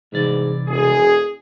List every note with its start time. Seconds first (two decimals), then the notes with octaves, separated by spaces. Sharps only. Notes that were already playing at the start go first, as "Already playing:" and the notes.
0.12 C2 G#2 E3 D5
0.68 E1 G#4